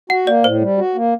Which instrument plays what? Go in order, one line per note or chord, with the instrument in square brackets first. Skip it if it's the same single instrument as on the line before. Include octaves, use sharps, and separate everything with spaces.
[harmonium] F#4 [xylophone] F#5
[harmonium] A#3 [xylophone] D5
[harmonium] A2 [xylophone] C5
[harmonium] G3
F#4
A#3